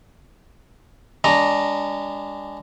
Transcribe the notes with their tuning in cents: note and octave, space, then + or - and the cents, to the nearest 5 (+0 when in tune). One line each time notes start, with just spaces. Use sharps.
G#3 -35 D4 -25 A#5 +0